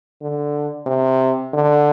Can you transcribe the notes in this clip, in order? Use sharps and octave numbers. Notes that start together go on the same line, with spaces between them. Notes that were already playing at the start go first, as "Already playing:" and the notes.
D3
C3
D3